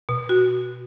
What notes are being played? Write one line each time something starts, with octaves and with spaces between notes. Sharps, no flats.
B2
F#4